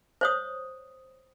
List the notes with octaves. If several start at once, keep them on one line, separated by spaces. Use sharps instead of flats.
C5 C#5 D#6